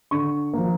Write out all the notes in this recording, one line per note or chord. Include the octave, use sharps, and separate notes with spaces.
D3 C#6
F3 A#3